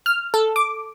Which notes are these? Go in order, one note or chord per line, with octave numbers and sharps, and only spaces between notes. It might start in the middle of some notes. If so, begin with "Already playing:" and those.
F6
A4
D6